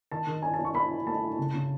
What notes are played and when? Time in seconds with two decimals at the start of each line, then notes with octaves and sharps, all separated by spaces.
0.12 D#3 A5
0.27 D#3
0.42 C#4 G#5
0.54 A5
0.59 C#4
0.65 C#6
0.74 C#4 B5
0.90 E4
1.06 A3 A5
1.22 E4
1.38 C#3
1.54 C#3